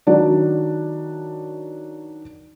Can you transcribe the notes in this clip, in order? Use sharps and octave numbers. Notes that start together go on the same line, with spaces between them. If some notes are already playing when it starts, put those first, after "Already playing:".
D#3 F#3 D4